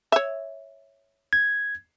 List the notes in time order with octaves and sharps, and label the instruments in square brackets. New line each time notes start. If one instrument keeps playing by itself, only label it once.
[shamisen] C#5 E5
[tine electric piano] G#6